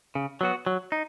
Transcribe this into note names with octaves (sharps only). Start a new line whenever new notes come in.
C#3
F#3 B3 F#4
F#3
D#4